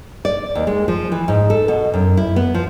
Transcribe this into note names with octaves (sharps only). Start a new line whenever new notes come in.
D5
D#2
G#3
F3
E3
G#2
A4
B2
F#2
E4
B3
F3